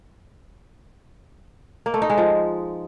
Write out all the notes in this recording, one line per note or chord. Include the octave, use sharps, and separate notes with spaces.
A#3
A3
D#4
G#3
F3